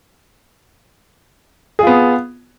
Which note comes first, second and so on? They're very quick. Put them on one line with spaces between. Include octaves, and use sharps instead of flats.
G#4 F4 B3